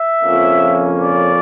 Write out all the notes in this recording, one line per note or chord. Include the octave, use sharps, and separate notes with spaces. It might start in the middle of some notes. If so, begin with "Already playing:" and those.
Already playing: E5
F2 C#3 F3 A#3 C#4
D5